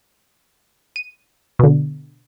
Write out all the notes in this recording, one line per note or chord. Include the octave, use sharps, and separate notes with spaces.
D#7
B2 D3